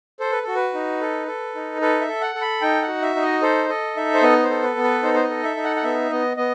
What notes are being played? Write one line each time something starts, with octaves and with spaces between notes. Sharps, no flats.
A4 C5
B4
F#4 A4
B4
D#4
A4
A4
D#4
A4 B4
E5
A4
F#5
A4
B5
D#4 G5
F#5
F#4
E5
D#4
D#5
A4 C5
A4 D#5
D#4 E5
C5
B3 D#5
C5
A4
B4
B3
B4
D#4 C5
C5
D#5
A4
E5
D#4
F#5
F#5
B3 E5
B3 D#5
B3 D#5